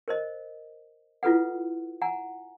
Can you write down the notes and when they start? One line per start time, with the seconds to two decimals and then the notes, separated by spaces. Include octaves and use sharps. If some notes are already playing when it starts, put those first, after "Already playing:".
0.08 A#4 C5 D#5
1.23 E4 F4 A4 B4 F#5
2.02 F#5 G#5 A#5